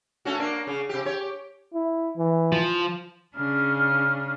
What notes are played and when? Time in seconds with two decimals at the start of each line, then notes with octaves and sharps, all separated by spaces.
0.25 A3 C#4 F#4
0.39 A#3 D4
0.67 C#3
0.89 C3 G4
1.05 G4 C#5
1.74 E4
2.18 E3
2.52 F3
3.36 C#3 D4 F6